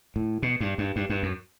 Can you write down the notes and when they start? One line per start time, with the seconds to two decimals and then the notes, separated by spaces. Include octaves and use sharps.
0.16 A2
0.42 B2
0.60 G2
0.78 G2
0.96 G2
1.10 G2
1.23 F#2